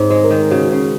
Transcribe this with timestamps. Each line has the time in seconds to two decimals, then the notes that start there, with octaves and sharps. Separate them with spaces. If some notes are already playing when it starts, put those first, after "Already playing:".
Already playing: G#2 C4 C#5
0.10 G#3 C5
0.24 A#4
0.31 D#3
0.51 C#3 F#4
0.72 C#3